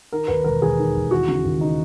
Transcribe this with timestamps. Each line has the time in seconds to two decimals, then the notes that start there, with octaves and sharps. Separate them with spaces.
0.12 D#3 A#4
0.28 D#2 B4
0.44 E1 A#4
0.62 E1 G#4
0.78 D#3
0.95 D#2
1.11 E3 F#4
1.28 C#3
1.45 D#2
1.61 D#4